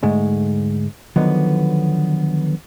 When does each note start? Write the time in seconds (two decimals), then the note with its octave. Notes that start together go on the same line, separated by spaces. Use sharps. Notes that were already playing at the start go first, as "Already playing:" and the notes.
0.03 D2 G#2 G#3 A3
1.16 D3 D#3 F3 F#3 B3